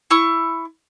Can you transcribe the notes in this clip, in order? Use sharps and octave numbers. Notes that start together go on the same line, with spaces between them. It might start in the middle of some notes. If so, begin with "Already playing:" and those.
E4 C#6